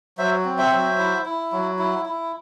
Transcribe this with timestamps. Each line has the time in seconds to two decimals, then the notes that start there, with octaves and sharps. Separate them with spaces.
0.18 F#3 C5 E5
0.45 C4
0.58 C5 E5
0.72 F#3
0.99 E4
1.25 E4
1.52 F#3
1.79 E4
2.06 E4